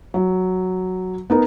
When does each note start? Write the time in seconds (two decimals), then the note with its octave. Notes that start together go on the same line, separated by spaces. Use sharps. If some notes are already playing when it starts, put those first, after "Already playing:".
0.14 F#3
1.30 B3 D#4 A#4